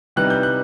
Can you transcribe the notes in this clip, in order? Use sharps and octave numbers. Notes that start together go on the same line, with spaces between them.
C3 E3 G3 B3 D#4 F#6
G6
F#6